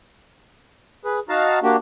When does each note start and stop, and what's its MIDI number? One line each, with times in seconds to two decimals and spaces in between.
1.05 1.19 68
1.05 1.19 71
1.29 1.59 63
1.29 1.59 66
1.29 1.59 77
1.29 1.59 81
1.29 1.59 82
1.63 1.76 58
1.63 1.76 62
1.63 1.76 66
1.63 1.76 67